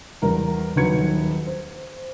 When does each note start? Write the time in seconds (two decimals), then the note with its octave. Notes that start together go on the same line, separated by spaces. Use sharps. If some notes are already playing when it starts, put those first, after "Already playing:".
0.22 E2 G3 A#4 A#5
0.76 D#1 D#3 F#3 B4 G#6 C#7
1.47 C5